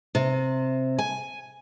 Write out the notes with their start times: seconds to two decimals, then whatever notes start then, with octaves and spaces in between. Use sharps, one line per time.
0.15 C3
0.98 G#5